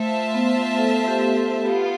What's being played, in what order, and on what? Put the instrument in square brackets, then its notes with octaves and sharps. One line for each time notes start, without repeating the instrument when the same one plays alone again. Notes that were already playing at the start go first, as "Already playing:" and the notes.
Already playing: [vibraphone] A3 [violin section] F4 C5 E5 A5
[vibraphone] B3
A4
G4
A4
[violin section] B3 F4 [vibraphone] G4